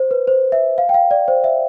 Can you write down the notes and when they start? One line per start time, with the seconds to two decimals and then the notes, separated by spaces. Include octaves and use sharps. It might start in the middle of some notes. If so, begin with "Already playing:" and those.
Already playing: C5
0.11 B4
0.27 C5
0.52 E5
0.78 F5
0.89 G5
0.94 F5
1.11 D5
1.28 C5
1.44 E5